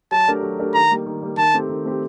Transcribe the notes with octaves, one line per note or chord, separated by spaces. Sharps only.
F#3 A5
A3 D4 G4 A#4
F#3
A3 D4 G4 A#4
D#3 A#5
G3 A#3
D#3
G3 A#3
D#3 A5
A3 C4 G4
D#3
A3 C4 G4